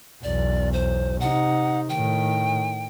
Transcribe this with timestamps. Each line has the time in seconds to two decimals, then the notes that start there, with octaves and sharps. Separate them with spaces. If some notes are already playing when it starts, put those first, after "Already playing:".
0.24 B1 E2 D5
0.73 C5
1.20 C3 D#4 F#5
1.89 A2 D#3 G5